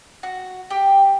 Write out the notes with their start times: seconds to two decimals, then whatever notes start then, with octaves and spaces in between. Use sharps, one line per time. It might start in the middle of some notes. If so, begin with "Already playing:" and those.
0.23 F#4
0.70 G4